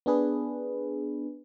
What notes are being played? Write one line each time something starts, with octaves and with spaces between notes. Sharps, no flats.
B3 D4 G#4 B4